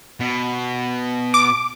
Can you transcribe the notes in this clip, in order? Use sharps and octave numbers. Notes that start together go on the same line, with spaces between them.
B2
D6